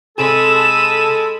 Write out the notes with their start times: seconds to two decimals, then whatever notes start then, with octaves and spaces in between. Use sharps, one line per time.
0.18 C3 G#3 G#4 A4 B5 E7